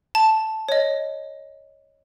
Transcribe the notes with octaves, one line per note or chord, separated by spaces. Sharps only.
A5
C#5 D#5